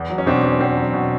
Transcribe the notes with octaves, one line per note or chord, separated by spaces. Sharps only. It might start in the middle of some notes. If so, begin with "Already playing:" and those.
Already playing: E2
F#3
C#4
B2 C4 D4
E2
E2 C4
F#3
B2